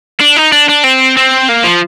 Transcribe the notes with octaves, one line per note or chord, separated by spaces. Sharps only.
D4
D#4
D4
D4
C4
C4
A#3
F3